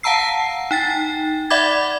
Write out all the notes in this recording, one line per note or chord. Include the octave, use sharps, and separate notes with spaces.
F5 F#5 A5 A#5 E6 C7
D#4 G5 A6
D5 E5 F#5 B5 D6 G#6